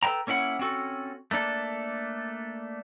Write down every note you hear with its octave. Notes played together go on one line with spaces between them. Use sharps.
A4 B4 E5 G5 A#5
A#3 C#4 E4 B4 F#5
C4 C#4 F#4 A4
A3 A#3 D4 A4